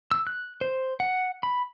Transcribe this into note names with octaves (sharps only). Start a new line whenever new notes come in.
E6
F#6
C5
F#5
B5